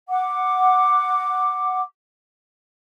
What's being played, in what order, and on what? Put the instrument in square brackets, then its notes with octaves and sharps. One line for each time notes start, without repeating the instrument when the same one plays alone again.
[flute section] F#5 D6